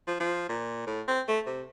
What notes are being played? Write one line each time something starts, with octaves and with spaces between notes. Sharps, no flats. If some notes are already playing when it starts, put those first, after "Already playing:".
F3
F3
A#2
A2
C4
A3
C3